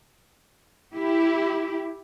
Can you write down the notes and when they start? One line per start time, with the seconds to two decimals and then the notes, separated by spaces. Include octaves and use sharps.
0.94 E4 G4